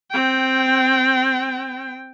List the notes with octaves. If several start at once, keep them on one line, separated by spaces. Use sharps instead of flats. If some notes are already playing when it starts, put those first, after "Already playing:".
C4 G5